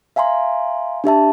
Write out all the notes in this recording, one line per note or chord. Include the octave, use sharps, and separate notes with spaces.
E5 F5 G#5 A#5 C6
D4 G4 E5 A5